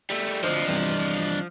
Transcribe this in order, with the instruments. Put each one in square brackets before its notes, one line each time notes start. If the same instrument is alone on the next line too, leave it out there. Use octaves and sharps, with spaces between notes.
[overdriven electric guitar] G3 A3
[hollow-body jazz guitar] D2 C5 [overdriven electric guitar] F3 [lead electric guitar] D4 D#5
[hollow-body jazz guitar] E2 G2 C3